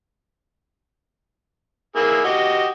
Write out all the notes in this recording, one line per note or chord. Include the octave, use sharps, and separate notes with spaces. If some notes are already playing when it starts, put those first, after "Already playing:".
A#3 E4 G#4
F#4 G4 D#5